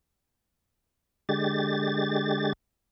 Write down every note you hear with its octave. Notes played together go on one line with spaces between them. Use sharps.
D3 G#3 G4 A6